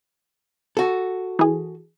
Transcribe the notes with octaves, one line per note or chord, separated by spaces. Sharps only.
F#4 A4
E3 G#4